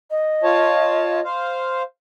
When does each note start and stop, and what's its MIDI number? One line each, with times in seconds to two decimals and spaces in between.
0.11 1.24 75
0.44 1.20 65
0.44 1.20 73
0.44 1.20 81
1.25 1.82 72
1.25 1.82 77